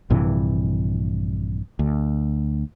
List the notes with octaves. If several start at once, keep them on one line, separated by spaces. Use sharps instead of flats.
A#1 G2 C3 E3
D2